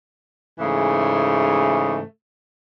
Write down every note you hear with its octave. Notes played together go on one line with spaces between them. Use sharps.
G#2 C#3 E3 A3